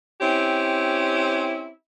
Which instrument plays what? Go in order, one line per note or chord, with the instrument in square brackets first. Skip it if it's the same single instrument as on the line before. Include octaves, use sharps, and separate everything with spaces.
[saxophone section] C4 C#4 E4 G4